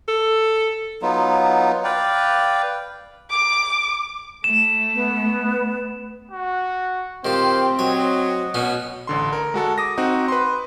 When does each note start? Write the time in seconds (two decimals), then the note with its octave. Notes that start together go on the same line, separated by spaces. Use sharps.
0.08 A4
1.02 F#3 B3 D#4 F4
1.84 B4 D5 F5 G5
3.30 D6
4.44 A3 E7
4.95 B3
6.31 F#4
7.25 D#3 C4 F4 G4 C5
7.79 F#3 C#5 D#5
8.54 B2 B3 C#4
9.07 A1 D3 C6
9.33 A#4
9.54 G#3 F#4 A4
9.78 D6 D#6 A#6
9.98 C4 D#4 F#4
10.28 B4 C6